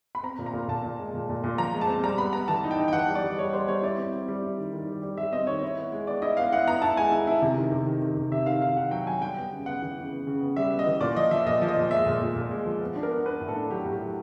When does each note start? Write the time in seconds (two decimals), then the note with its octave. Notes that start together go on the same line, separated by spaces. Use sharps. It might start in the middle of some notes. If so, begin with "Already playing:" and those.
0.15 B5
0.23 C4 A#5
0.38 A#2
0.46 A#5
0.53 A#2
0.68 A#2 A5
0.83 A#2
0.99 G#3
1.14 A#2
1.29 A#2
1.44 A#2
1.58 F3 A#5
1.73 G#3
1.81 A5
1.88 C4
2.03 G3 A#5
2.18 B3 B5
2.33 B3 A#5
2.48 E3 A5
2.64 D#4
2.71 G5
2.78 D#4
2.88 G5
2.93 E3 F#5
3.08 G3
3.15 D5
3.23 G3
3.39 G3 C#5
3.53 G3 C5
3.68 G3 C#5
3.83 E4 D5
3.97 C4
4.13 C4
4.28 G3
4.42 E4
4.57 D#3
4.73 D#3
4.87 G3
5.02 G3
5.18 G3 E5
5.33 C4 D#5
5.47 D#3 C#5
5.63 E4
5.78 B3
5.92 G#3
6.07 B3 D5
6.22 E4 D#5
6.37 B3 F5
6.52 E4 F#5
6.67 B3 A#5
6.82 E4 A5
6.97 G#3 G#5
7.12 E4
7.27 E4
7.42 C3
7.57 D#3
7.72 C3
7.86 D#3
8.02 D#3
8.17 C3
8.31 C3 E5
8.46 D#3 F5
8.61 D#3 F5
8.77 D#3 F#5
8.91 F#3 G5
9.06 F#3 G#5
9.21 G3 G5
9.37 B3
9.52 C#3
9.66 B3 F#5
9.82 E3
9.97 C#3
10.12 B3
10.27 C#3
10.41 B3
10.56 G3 E5
10.71 B3
10.79 D#5
10.86 E3
11.01 A#2 D5
11.16 F3 D#5
11.31 F3 E5
11.46 A#2 D#5
11.62 F3
11.68 D#5
11.76 A#2
11.91 G#3 E5
12.06 A#2
12.21 A#2
12.36 A#2
12.51 G#3
12.66 F3
12.80 B3
12.96 D4
13.03 A#4
13.11 B3
13.26 D4 B4
13.41 A2
13.48 A4
13.56 D4
13.70 F#3 G4
13.85 A2
13.93 G4
14.01 F#3